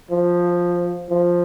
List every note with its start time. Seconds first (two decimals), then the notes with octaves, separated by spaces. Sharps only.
0.11 F3
1.10 F3